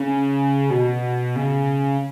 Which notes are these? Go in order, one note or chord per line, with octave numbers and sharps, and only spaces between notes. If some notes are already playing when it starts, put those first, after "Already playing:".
Already playing: C#3
B2
C#3